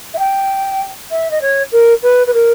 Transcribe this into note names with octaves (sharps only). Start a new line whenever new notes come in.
E5
G5
E5
D#5
C#5
A#4
B4
B4
A#4